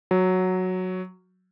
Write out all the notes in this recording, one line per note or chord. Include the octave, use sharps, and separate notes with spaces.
F#3